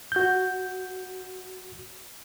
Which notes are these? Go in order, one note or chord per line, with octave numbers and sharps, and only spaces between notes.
F#4 G6